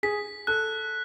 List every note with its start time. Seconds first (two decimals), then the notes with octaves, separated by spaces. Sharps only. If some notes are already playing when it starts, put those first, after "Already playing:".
0.03 G#4 B6
0.47 A4 F#6